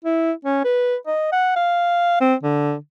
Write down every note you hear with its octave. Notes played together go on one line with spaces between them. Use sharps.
E4
C#4
B4
D#5
F#5
F5
C4
D3